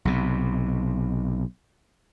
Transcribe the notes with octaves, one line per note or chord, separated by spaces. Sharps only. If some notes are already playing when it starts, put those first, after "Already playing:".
B1 C3